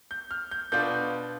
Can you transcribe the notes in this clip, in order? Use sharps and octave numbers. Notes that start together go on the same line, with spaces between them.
G6
F6
G6
B2 B3 D4 F4 G6